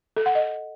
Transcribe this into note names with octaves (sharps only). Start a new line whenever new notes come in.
A4
F#5
D#5